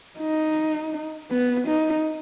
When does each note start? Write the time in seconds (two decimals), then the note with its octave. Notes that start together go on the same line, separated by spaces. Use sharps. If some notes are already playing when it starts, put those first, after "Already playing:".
0.19 D#4
1.31 B3
1.68 D#4